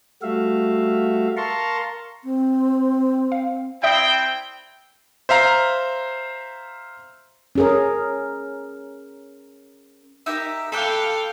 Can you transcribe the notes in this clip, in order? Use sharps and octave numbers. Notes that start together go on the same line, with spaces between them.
G3 A3 F#4 E5 F5
A#4 F5 A5 A#5 C6 C#6
C4
F5
C4 E4 D5 E5 G5 D#6
C5 E5 F5 A#5
C#4 G#4 A#4
D#4 G4 A#4 E5
A4 F5 G5 B5 D6 F#6